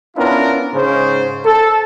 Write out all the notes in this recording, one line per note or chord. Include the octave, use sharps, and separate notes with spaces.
B3 C#4 D4 E4 F4 A#4
G#2 C#3 C5
A4